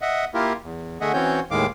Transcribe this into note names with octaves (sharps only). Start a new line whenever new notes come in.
D#5 E5 F#5
A#3 E4 F4 G4 A#4
E2
D3 A3 G#4 D#5 E5 F#5
E3 C4 C#4 F#4 C#5 G6
D#2 A2 D#3 G#3 F5 D6